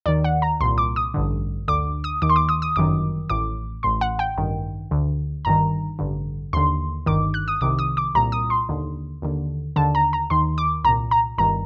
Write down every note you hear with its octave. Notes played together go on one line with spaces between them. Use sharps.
D#2 D#3 D5
F#5
A#5
C2 A#2 C6
D6
D#6
A1 G2 D3
D2 D3 D6
D#6
D#2 D#3 D6
C6
D6
D#6
D#6
G1 F#2 D#3 D6
A1 A2 D6
A1 A2 C6
F#5
G5
A1 G2 D#3
D2 D3
G1 G2 D#3 A#5
A1 G2 D3
D#2 D3 C6
G1 G2 D#3 D6
F#6
D#6
C2 C3 D#3 D6
D#6
D6
C2 A#2 A#5
D#6
C6
D#2 D3
D#2 D3
D#2 D3 A5
A#5
A#5
D#2 D#3 C6
D6
C2 A#2 A#5
A#5
G1 G2 D#3 A#5